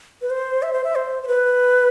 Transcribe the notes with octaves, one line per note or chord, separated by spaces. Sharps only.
B4
C5
E5
C5
E5
C5
C5
B4